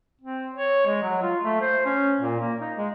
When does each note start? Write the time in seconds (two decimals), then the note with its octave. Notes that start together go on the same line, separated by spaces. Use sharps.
0.22 C4
0.55 C#5
0.86 G#3
1.03 F#3
1.22 F4
1.43 A3
1.61 C5
1.86 C#4
2.21 A#2
2.39 A#3
2.60 D#4
2.77 G#3